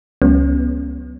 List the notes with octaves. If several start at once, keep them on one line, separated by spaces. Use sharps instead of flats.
C#2 F#3 G#3 B3 C#4